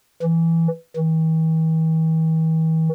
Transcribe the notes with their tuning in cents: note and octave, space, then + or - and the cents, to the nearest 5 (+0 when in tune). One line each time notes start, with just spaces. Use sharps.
E3 +5
E3 -45